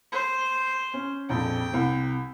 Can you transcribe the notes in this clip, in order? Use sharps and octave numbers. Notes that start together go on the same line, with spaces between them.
C5
C#4
A#1 F2 G5
C2 C3